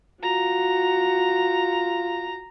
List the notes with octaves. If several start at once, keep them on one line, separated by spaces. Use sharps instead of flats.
F4 F#4 A#5